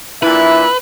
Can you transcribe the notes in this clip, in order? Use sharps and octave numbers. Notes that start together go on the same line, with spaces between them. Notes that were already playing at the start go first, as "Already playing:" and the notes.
A#2 D4 E4 B4 E5